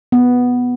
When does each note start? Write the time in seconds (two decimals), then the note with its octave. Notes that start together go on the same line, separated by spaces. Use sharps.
0.12 B3